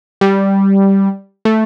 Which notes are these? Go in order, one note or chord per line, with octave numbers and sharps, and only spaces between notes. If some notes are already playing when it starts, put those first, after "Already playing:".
G3
A3